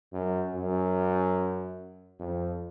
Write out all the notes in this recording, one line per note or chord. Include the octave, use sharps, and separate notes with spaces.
F#2
F#2
F2